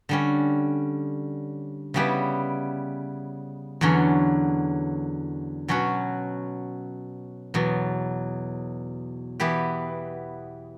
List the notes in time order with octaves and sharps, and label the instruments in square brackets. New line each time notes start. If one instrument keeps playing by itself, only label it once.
[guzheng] D3 G3 C#4
C#3 G3 B3 E4 G4
E2 D3 F#3 C#4
B2 F#3 C#4 F#4
E2 B2 F#3
E3 B3 E4 G4